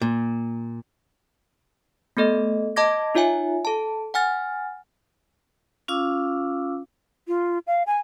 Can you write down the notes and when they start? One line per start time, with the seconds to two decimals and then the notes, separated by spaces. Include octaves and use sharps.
0.02 A#2
2.17 A3 B3 A4 D#5
2.76 D#5 A5 B5 D6 G#6 A#6
3.15 D#4 F4 C#5 E5 G#5
3.65 A4 A5
4.14 F#5 G#5 F6 A6
5.88 C#4 F4 F5 D6 E6
7.28 F4
7.67 F5
7.87 G#5